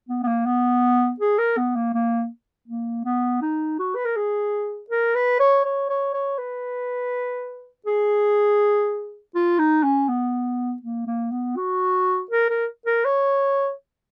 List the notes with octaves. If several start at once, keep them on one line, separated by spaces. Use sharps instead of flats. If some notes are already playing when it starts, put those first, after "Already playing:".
B3
B3
A#3
B3
G#4
A#4
B3
A#3
A#3
A#3
B3
D#4
F#4
B4
A#4
G#4
A#4
B4
C#5
C#5
C#5
C#5
B4
G#4
F4
D#4
C#4
B3
A#3
A#3
B3
F#4
A#4
A#4
A#4
C#5